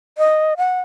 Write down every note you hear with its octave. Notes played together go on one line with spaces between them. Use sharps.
D#5
F#5